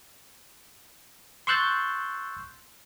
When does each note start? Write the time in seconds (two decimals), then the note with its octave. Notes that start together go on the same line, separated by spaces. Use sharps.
1.47 C6 C#6 E6 F#6 G6 A6